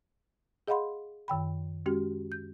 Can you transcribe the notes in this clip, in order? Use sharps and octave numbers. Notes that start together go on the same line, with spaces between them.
G#4 D#5 F5 F#5 B5 C6
F#2 D#3 G5 B5
G#3 C#4 F#4 G4
G6